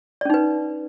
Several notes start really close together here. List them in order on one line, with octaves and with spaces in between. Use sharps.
D5 C#4 D#4 B4